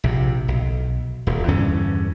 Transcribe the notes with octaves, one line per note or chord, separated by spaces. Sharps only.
A#1 C3
B1
D#1 D2
E2 G2 D3 C#4